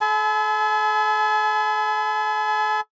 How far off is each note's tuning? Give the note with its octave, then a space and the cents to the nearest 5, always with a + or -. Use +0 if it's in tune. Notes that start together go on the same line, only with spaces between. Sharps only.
A4 -35 G#5 +45 B5 +45